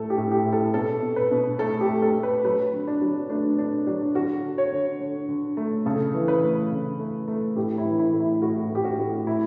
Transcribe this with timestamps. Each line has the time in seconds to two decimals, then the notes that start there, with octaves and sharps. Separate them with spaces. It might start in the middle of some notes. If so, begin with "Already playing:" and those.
Already playing: A2 A3 A4
0.10 G4
0.17 A2
0.31 G4
0.46 A2
0.52 A4
0.74 B2 A4
1.02 B2
1.16 B4
1.31 B2
1.59 A3 A4
1.81 G4
1.88 A3
2.02 A4
2.16 A3
2.23 B4
2.45 F#3 B4
2.73 D3
2.88 D4
3.02 F#3
3.30 A3 D4
3.58 D3 D4
3.87 F#3 D4
4.15 D3 F#4
4.44 D3
4.58 C#5
4.72 D3
5.00 D3
5.29 D3
5.57 A3
5.86 C#3 A4
6.14 E3
6.28 B4
6.42 A3
6.72 C#3
6.99 A3
7.28 A3
7.56 A2 G4
7.78 E4
7.85 E3
7.99 E4
8.13 A2
8.20 E4
8.42 A2 F#4
8.70 A2 G4
8.84 F#4
8.99 A2
9.27 A2 E4